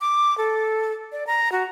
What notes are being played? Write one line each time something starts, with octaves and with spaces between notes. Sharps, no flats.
D6
A4
D5
A#5
F#4